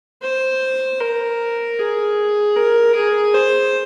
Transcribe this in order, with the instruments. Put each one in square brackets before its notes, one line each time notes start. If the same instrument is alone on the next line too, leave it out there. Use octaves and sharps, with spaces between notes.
[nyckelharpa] C5
A#4
G#4
A#4
G#4
C5